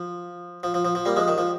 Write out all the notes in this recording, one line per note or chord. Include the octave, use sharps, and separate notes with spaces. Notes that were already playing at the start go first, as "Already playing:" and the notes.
Already playing: F3
F3
F3
F3
F3
G3 A#3
F3 G#3
D#3
F3